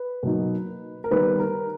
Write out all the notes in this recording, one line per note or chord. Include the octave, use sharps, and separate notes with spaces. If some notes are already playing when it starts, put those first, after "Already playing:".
Already playing: B4
B2 F#3 A#3 D#4
A#4
D#3 G3 B3 B4
A#4